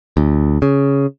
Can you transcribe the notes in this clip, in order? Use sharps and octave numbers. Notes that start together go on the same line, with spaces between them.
D2
C#3